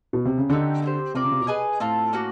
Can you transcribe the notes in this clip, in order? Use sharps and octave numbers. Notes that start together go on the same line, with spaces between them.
B2
C3
C#3
D3 A3 C4 D#4 G4
C4 E4 G4 C5
C3 F4 A#4 D5
C#3
C3
B2
G#4 B4 D#5 G#5
A2 C4 F4 A4
A#3 C#4 F#4